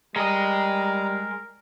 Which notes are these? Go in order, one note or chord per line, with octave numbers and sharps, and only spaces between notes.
G3 G#3 A#4 D#5 A#5